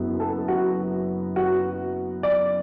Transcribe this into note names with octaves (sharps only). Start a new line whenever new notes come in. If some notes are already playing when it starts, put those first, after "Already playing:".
Already playing: F#1 F#2 F#3 B3
A4
F#4
F#4
D5